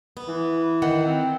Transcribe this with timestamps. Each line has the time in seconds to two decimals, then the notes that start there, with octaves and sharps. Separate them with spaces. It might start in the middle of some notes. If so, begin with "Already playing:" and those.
0.17 B3
0.28 E3
0.82 D#3 F#5
1.05 C4